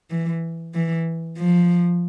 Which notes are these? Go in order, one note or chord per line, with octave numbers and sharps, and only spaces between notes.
E3
E3
F3